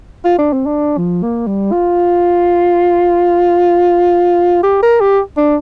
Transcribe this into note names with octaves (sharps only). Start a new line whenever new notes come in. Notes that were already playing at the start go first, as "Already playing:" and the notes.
F4
D4
C4
D4
F3
A#3
G3
F4
G4
A#4
G4
D4